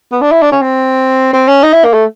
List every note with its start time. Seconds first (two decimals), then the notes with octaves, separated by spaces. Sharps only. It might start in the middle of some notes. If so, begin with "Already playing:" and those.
0.12 B3
0.21 D4
0.32 E4
0.42 D4
0.52 C#4
0.62 C4
1.33 C4
1.48 C#4
1.63 D#4
1.73 E4
1.84 A#3
1.93 A3